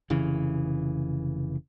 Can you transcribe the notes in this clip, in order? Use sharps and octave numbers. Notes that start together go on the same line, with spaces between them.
F1 C#3 E3